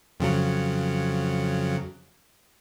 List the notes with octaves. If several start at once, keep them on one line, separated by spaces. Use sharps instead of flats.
F2 C#3 F#3